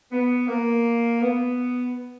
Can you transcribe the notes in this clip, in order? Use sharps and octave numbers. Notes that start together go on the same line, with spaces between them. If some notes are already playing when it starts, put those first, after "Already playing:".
B3
A#3
B3